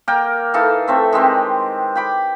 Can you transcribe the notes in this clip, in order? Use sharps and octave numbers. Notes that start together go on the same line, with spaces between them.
A#3 A#4 G5
E3 D#4 A4 F5
A3 C4 E5
D#3 G#3 C4 G4
G5 B5 D6